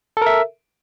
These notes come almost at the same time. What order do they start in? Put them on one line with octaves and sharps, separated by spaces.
A4 A#4 E5